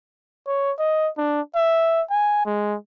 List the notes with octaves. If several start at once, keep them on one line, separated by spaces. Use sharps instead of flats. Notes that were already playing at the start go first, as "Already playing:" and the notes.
C#5
D#5
D4
E5
G#5
G#3